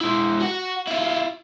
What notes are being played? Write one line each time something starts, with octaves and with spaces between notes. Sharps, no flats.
G#3 E4
F#4 F#5
E4 F4